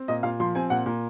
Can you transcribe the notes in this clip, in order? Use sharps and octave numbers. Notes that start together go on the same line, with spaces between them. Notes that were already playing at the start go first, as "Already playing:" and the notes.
Already playing: C4
A#2 D#5
A#2 F5
F3 C6
C4 G#5
A#2 F#5
A#2